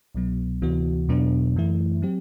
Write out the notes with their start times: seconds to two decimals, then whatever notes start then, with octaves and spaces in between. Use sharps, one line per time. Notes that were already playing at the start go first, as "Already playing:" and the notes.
0.15 C2 B2 F#3 B3
0.62 D2 C3 E3 B3 F#4
1.09 E2 B2 F#3 B3 D4
1.56 F#2 E3 A3 E4
2.02 F#3 C4 G4